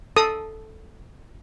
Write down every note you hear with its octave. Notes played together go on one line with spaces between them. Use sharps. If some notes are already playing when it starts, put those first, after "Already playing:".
A4 D#6